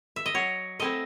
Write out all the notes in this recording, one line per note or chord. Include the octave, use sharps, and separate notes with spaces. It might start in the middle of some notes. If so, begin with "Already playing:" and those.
E5
D#5
F#3 C#5
A3 C4 E4 D#5